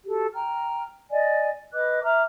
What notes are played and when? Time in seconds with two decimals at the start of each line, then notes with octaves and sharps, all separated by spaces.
0.06 F#4 G4 A4
0.34 G5 A#5 F6
1.12 D5 D#5 G#5
1.73 B4 D#5 D6 F#6
2.03 E5 A#5 D6 F6